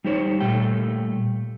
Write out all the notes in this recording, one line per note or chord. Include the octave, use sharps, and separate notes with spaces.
G3 D#4 G4 C5 C#5
A#2 G3 A3 G5